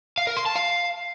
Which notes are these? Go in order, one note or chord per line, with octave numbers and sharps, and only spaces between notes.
F5
A#4
C6
A5
F5